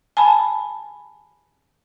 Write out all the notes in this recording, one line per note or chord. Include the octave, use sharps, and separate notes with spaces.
G#5 A5 B5